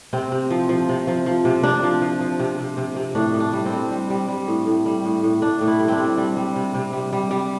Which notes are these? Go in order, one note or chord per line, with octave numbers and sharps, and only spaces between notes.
C3 C4
C3
F3
F3
C3
F3
F3
C3
C3 D4
F3
F3
F3
C3
C3
C3
C3
A2 D4
A2
D4
G3
C4
G3
G3
G3
G3
A2
A2
G3
A2
A2
A2 D4
A2
E4
G3
C4 D4
G3
G3
G3
C3
C3
G3
G3
G3